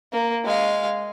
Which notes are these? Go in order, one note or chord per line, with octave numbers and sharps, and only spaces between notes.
A#3
G#3 F5